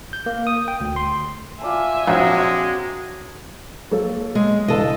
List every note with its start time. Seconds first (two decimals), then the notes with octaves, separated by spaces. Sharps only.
0.13 G6
0.26 A#3
0.47 D#6
0.68 G5
0.81 D2
0.96 C6
1.61 F4 D5 E5 G#5 A5
2.07 A#1 F#3 G#3 C4 G5
3.91 F#3 A#3 A4
4.35 G#3
4.68 C#2 G2 E3 A4 D#5